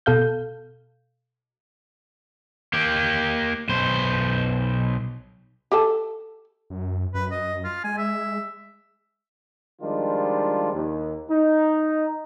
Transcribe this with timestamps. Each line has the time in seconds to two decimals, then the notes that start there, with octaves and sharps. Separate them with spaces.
0.06 B2 A4 F5 G6
2.73 A#3 G4
3.69 B1 C5
5.72 G4 A4 A5
6.70 F#2
7.14 F#2 B4
7.31 D#5
7.64 F4
7.84 G#3 G#5
7.98 E5
9.82 D#3 F3 G3 G#3 D4 F4
10.73 D#2
11.30 D#4